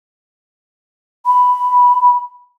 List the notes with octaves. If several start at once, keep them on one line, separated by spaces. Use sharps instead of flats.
B5